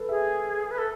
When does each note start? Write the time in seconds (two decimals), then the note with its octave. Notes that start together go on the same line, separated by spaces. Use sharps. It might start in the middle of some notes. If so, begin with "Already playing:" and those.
Already playing: A4 B4
0.09 G#4 E5
0.71 B4
0.78 A4